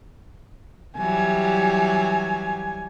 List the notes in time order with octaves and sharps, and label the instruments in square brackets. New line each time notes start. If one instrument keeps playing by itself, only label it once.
[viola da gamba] E3 F#3 G3 [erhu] G#5